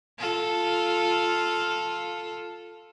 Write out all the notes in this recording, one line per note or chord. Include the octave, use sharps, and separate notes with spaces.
F4 A4